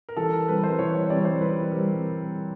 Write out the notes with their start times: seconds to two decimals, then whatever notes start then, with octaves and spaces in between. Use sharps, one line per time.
0.09 A#4
0.17 E3 A4
0.33 A#4
0.48 G3 C4 B4
0.64 C5
0.79 E3 C#5
0.95 C#5
1.10 G3 C4 D5
1.25 C5
1.41 E3 B4
1.72 G3 C4 A#4